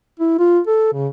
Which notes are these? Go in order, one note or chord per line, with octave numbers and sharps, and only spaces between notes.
E4
F4
A4
C#3